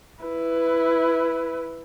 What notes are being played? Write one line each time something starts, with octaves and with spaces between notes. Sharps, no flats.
E4 B4